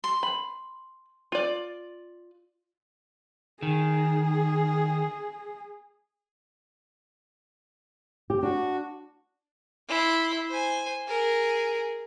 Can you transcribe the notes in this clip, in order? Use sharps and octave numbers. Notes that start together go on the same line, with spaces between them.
C6
B5
F4 D5
D#3 G#4
G4
D4 F#4
E4 C6
C5 G#5
G#4 A#4